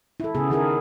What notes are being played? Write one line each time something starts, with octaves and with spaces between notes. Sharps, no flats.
E4 A4
C#3 B3 G#4
D#3 E4 G#4 A#4